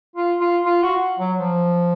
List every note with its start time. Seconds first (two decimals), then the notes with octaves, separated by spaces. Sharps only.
0.16 F4
0.40 F4
0.65 F4
0.83 F#4
1.19 F#3
1.37 F3